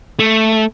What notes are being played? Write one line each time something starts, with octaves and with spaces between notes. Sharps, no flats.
A3